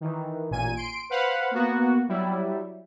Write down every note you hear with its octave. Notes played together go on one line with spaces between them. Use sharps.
D#3 E3
A1 A#2 G#5 D#7
C6 D7
B4 C5 F5 F#5 B5
A#3 B3 F#4
F#3 G3 E4